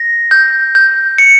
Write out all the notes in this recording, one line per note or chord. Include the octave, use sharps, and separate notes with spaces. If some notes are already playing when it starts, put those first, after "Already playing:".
Already playing: A#6
G6
G6
C#7